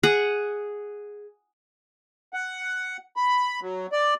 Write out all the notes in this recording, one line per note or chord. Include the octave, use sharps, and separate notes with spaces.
G#4 F#5
F#5
B5
F#3
D5